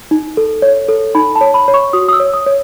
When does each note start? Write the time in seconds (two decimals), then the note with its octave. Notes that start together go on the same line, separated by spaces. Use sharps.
0.11 D#4
0.37 A4
0.62 C#5
0.88 A4
1.15 D#4 B5
1.36 A5
1.41 C#5
1.54 B5
1.68 C#5
1.74 C#6
1.93 F#4 D#6
2.08 D#6
2.13 E6
2.20 C#5
2.34 D#6
2.46 C#5